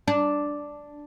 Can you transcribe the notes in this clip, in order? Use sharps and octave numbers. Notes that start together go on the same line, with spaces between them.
D4